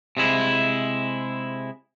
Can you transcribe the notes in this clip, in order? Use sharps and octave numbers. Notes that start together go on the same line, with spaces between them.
C3 G#3 E4